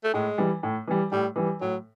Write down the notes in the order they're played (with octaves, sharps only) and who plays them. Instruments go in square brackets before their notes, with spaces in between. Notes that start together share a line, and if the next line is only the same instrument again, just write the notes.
[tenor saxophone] A3
[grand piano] A2 [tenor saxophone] G#3
[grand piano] E3 G3
A2
E3 G3
[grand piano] A2 [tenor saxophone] G3
[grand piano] E3 G3
[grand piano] A2 [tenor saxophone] F#3